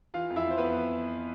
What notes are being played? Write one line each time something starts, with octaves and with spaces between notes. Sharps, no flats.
E3 F4 F5
F2
E4 E5
F2 C5
B3 B4
F2